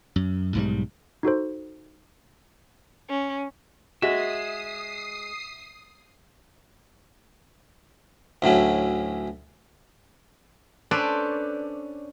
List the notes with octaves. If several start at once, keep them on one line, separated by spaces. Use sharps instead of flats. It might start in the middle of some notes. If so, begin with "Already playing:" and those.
F#2
B1 G#2 E3 G3
D#4 F#4 A4 C5
C#4
G#3 F#4 E5 D#6 C7
D2 A2 F#3 C#4
C#4 D4 A4 B4 C5 D5